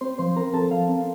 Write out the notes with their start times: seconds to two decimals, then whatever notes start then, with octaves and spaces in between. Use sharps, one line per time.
0.01 C4 C5 C6
0.18 F3 C5 C6
0.36 C4 A#4 A#5
0.53 F3 A4 A5
0.71 F3 F5
0.89 C4